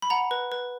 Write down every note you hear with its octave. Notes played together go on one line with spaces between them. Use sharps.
B5
F#5 A#5
B4
B4